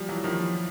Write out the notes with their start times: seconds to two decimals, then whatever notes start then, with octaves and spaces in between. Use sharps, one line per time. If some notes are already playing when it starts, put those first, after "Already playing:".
Already playing: F3 G3
0.09 E3 F#3
0.24 D#3 F3